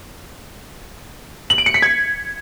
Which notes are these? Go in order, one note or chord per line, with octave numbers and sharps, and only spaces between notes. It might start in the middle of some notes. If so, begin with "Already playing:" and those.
F#7
D7
C#7
B6
G#6